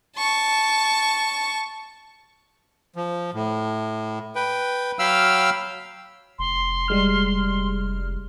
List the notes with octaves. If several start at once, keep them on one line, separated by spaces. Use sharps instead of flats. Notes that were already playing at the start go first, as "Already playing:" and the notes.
A5 C#6
F3
A2
B4 G5
F#3 F5 G5 B5 E6 F6
F1 C6
G3 G#3 F6